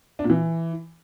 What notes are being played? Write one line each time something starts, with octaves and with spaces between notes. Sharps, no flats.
D4
A#2
E3